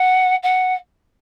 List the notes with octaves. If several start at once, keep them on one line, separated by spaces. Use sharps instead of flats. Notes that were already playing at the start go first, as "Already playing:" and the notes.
Already playing: F#5
F#5